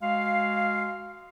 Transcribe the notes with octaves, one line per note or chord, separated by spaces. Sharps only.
G#3 F#4 F5